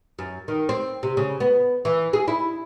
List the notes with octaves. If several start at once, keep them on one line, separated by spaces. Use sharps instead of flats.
F#2
D#3
C4
C3
C#3
B3
E3
G#4
E4